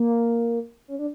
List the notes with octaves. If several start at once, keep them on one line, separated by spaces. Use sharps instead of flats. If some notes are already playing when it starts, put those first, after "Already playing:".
Already playing: A#3
C#4
D4